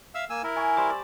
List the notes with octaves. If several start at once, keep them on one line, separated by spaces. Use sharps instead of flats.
E5 F5 E6
A#3 G#5 E6
E4 A#4
G#5 C#6
G3 C5 D6
D5